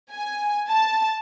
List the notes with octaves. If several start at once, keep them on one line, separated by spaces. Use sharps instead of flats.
G#5
A5